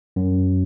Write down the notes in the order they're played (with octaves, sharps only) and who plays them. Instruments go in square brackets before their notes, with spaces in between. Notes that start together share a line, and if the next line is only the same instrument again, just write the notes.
[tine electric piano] F#2